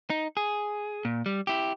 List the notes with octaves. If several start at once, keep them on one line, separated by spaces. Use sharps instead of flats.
D#4
G#4
A#2
G3
E4 G4